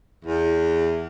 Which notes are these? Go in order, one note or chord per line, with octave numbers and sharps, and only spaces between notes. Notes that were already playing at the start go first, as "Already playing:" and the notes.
E2